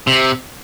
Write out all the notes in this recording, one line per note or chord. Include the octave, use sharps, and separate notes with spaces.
C3